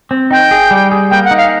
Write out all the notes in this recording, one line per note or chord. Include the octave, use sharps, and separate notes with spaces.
C4
D#4 G5
G#4
G3
G#4
A#3 G5
F#5
D#4
F5